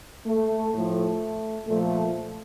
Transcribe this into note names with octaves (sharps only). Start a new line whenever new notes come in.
A3
A2 F3 A3
A#2 F3 A3